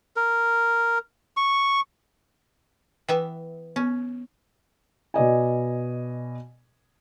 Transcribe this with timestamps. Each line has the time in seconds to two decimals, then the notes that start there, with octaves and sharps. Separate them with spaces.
0.16 A#4
1.37 C#6
3.08 E3 B3 E5 G5
3.76 B3 C#4
5.14 B2 D5 D#5 G#5